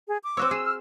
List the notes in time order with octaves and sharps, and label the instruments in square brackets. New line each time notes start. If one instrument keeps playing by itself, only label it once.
[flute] G#4
D6
[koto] C4 F#4 C#5 [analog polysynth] E6
[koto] G#4
[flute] F6